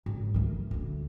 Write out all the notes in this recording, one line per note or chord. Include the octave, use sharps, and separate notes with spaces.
G#1
D#3 A3
D2 D4